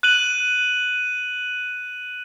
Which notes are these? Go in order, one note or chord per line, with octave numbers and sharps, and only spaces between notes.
F#6 D#7 F#7